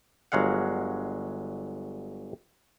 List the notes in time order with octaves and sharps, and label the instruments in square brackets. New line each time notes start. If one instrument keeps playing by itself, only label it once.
[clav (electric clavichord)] G1 F#3 G#3 F5 F#5